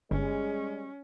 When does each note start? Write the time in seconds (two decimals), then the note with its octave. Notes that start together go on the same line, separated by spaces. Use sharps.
0.11 G1 G3 G#3 C#4